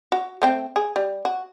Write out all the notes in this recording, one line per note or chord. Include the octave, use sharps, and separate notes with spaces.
F#4
A3 C4 G5
G#4
G3
F#4